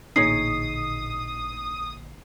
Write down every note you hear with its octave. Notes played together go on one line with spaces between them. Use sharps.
A1 A#2 D3 D#4 G#4 C#5 D#6 C7